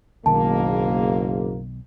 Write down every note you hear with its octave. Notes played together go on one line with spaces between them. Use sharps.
F#1 B1 G#2 D#3 A#3 A5